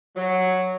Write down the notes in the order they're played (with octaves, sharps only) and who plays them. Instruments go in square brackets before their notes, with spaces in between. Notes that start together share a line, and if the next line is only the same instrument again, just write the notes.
[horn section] F#3